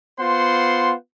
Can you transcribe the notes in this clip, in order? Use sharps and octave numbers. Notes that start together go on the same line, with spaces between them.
B3 F4 C5 F#5 C6